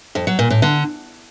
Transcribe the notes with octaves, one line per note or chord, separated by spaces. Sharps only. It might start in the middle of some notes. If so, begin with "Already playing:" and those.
F2
F#3
A#2
A2
D3